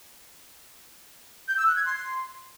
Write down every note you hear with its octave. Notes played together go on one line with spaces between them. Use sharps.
G6
E6
F#6
G#6
C6